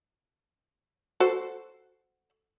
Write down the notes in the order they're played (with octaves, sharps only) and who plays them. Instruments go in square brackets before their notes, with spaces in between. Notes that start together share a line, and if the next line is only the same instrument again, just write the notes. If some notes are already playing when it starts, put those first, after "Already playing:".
[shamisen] F#4 A4 C5